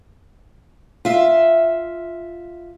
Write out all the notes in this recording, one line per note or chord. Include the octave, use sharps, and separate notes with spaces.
F4 E5